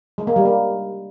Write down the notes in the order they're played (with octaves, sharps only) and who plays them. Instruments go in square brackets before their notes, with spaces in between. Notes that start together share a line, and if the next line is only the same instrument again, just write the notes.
[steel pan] G#3
A#3
G3
A#3